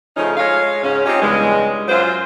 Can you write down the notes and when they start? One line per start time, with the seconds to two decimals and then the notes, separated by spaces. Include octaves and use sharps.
0.17 C#3 F3 A3 C#4 D#4
0.37 G#3 F4 C#5 F5
0.83 G#2 C#3 C#4
1.06 C4 C#4 D#4 F4 G4
1.22 E2 G2 C#3 G#3
1.88 F#2 F#3 F4 C5